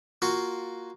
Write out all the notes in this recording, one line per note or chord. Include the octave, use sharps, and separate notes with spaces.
A#3 F4 F#4